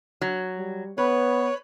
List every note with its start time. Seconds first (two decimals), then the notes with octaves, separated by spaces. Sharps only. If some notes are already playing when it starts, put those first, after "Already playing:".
0.21 F#3
0.58 G3
0.98 B3 B4 C#5